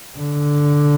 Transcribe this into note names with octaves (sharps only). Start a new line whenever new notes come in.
D3